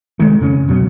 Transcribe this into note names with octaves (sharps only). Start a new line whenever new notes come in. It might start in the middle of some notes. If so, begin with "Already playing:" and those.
C2 D#3 G#3 A3
F2 C#3 C#4
C#2 B2 F#3